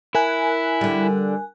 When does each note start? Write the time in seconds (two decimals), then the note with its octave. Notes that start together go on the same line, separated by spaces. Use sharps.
0.15 E4 A#4 G#5 F#6
0.81 D3 G3